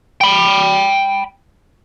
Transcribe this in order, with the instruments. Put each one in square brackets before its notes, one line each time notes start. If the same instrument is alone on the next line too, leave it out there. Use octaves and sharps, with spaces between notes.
[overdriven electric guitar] G5 B5